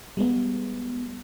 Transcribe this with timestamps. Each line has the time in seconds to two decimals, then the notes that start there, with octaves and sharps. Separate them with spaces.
0.17 G3 G#3 B3